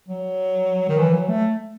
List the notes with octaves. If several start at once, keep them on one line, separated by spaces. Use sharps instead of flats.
F#3
D#3
E3
F#3
A3